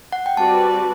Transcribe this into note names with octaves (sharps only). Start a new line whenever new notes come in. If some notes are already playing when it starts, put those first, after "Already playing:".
F#5
G5
G3 C4 F#4 B4 D5 A5